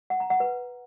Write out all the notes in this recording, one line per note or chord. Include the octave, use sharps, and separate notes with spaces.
F#5
A#5
F#5
B4